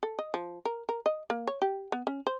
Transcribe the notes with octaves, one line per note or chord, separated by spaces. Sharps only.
A4
D#5
F3
A#4
A#4
D#5
A#3
C#5
G4
B3
C#4
C5